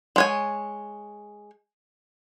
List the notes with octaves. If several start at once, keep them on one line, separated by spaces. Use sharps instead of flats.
G#3 C#5 G#5